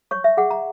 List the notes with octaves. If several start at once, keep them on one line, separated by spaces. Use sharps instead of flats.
C#5 C#6
E5
G#4 F#5
A#5